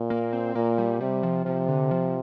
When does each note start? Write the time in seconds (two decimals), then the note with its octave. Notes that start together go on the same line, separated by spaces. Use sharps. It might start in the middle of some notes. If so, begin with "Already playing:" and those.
Already playing: A#2
0.10 A#3
0.33 C4
0.55 A#2 A#3
0.78 G3
1.01 C3 G3
1.23 F3
1.45 C3 F3
1.69 D3
1.91 F3